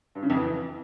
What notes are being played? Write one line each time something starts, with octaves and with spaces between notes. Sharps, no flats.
G2
C#3
F2
E3